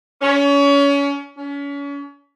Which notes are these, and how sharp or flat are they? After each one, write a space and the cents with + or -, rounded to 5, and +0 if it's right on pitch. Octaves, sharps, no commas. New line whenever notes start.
C#4 +30
C#4 +35